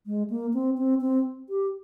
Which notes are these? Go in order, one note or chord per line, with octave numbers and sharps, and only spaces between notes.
G#3
A#3
C4
C4
C4
G4